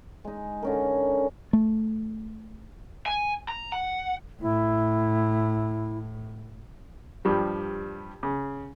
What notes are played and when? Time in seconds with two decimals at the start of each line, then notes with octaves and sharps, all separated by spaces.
0.25 G#3 D#4
0.62 D3 C#4 A#4
1.53 A3
3.06 G#5
3.48 A#5
3.72 F#5
4.41 A2 E4
7.25 G2 F3 G3
8.23 C#3